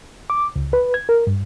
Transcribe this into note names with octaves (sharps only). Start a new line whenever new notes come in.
D6
C#2
B4
G#6
A#4
G2